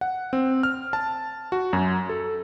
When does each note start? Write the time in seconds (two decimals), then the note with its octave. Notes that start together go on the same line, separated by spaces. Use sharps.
0.01 F#5
0.33 C4
0.63 F6
0.93 A5
1.52 F#4
1.73 F#2
2.09 A4